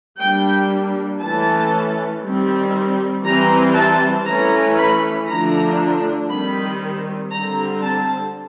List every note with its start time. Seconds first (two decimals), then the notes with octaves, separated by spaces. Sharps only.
0.19 G3 A#3 D4 G5
1.20 E3 A3 C#4 A5
2.22 D#3 G3 C4
3.24 E3 G3 C4 A#5
3.75 A5
4.26 E3 A3 C#4 A#5
4.77 B5
5.27 D3 F3 A3 D4 A#5
6.29 D#3 G3 C4 B5
7.31 D3 G3 C4 A#5
7.82 A5